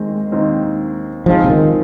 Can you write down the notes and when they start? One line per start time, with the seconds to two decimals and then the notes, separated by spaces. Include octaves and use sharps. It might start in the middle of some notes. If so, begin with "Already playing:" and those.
Already playing: D#2 D#3 G#3 C4
0.32 D#2 D#3 C4 D#4
1.26 G#2 F3 G#3 C4 F4
1.44 C3
1.50 D#3